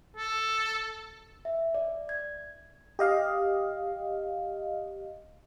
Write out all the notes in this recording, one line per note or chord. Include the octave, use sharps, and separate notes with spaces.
A4
E5
D5
G#6
G4 D#5 F5